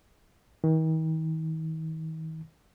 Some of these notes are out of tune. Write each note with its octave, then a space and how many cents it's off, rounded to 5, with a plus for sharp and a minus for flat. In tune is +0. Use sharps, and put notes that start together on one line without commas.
D#3 +40